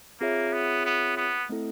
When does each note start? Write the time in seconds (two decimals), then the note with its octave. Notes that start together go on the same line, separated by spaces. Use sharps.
0.20 A#3 C4 F4 G#4 C#5 E5
0.53 B3
0.86 B3
1.17 B3
1.49 A3 C4 E4 A4